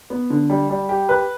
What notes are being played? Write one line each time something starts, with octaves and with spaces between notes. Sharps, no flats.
B3
D3
G3
G3
G4
B4